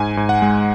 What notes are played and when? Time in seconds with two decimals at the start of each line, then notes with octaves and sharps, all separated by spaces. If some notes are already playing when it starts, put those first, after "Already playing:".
Already playing: G#2 G#5
0.17 G#2
0.29 F#5
0.42 G#3